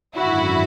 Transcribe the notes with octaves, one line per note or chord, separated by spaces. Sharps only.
G#1 F#2 D3 E4 F#4